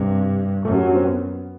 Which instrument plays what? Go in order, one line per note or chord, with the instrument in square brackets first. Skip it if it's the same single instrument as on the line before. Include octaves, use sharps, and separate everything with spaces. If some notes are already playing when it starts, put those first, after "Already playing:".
Already playing: [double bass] G2 [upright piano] C3
[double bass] F#2 [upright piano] A3
[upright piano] G3
F#3
D4
C4
B3